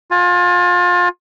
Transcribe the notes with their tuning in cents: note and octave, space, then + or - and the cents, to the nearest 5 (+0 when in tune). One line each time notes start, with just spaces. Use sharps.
F4 +30 G#5 +0